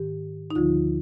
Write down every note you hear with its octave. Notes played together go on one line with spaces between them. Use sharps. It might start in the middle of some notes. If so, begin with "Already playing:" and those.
Already playing: G#2 D#3 G4
D#4
D2 D3 F3 F4